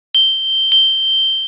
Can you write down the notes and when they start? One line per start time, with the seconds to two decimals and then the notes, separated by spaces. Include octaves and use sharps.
0.15 G7
0.72 G7